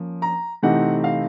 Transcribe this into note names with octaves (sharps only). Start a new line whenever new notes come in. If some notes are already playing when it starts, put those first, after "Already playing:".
Already playing: F3 A#3 C#4
A#5
C3 E3 A3 C4 D#4 F#5
F5